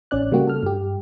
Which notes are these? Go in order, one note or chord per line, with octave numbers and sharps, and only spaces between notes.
A1 C#4 D5 F#6
C#3 G3 A#3 F#4 G4
A4 F6
G2 G4